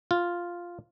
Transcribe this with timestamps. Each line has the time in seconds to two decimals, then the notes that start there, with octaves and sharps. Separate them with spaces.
0.11 F4